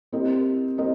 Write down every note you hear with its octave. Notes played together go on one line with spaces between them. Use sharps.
C4 E4 G4 A#4 D#5
C4 E4 G4 A#4 D#5